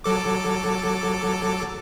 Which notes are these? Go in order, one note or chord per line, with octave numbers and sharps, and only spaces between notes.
F#3 A4 D6